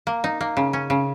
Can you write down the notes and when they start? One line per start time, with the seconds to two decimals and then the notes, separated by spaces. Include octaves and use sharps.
0.07 A#3
0.24 D#4
0.41 A#3
0.57 C#3
0.73 C#4
0.90 C#3